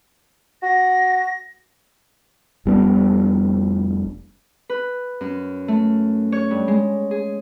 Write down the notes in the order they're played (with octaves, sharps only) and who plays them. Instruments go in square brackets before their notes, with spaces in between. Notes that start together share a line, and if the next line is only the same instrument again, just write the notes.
[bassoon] F#4 [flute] A#6
[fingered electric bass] F1 G3 B3 D4
[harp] B4
F#2
A3
C#5
G2
G#3
G#4